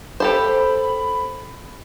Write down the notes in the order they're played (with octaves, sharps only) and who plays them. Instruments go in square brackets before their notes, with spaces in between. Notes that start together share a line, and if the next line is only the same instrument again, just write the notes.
[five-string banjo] G4 A4 C5 [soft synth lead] B5